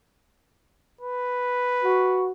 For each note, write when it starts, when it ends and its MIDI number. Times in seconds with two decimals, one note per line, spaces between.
1.01 2.31 71
1.83 2.30 66